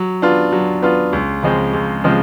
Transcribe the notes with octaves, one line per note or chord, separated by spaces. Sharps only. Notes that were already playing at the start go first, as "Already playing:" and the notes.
Already playing: F#3
B3 D4 F4
F#3
B3 D4 F4
C#2
C#3 F3 G#3 C4
C#2
C#3 F3 G#3 C4